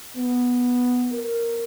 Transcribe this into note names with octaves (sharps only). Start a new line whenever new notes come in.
B3
A#4